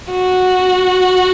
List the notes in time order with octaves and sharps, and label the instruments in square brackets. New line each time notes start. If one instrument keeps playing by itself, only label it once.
[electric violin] F#4